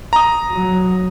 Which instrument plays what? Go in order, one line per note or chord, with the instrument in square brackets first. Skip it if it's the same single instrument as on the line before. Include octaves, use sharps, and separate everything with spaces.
[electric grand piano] A#5 D#6
[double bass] F#3